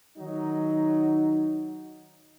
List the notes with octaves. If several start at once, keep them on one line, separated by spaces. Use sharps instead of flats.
D#3 F#3 D#4